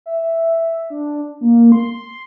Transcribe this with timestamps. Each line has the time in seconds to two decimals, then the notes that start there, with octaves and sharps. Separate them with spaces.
0.06 E5
0.90 D4
1.41 A#3
1.72 C6